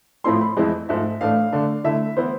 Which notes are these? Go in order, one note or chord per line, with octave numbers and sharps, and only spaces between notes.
A2 F3 A3 C4 E4 C6
B5
F2 E3 G#3 C4 E4
G#2 F3 A3 E5
A2 E3 A3 D4 F5
D3 A3 D4
D3 A3 E4 E5
E3 B3 E4 C5